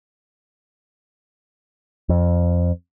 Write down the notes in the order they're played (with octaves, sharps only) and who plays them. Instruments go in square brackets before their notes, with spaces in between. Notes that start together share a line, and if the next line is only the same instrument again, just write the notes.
[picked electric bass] F2